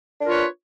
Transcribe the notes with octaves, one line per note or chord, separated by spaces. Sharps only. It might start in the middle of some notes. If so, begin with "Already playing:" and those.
D4 F4 A#4 B4 C#5